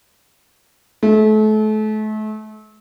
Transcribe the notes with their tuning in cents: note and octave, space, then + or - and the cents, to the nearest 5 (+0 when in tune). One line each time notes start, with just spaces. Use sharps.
A3 -35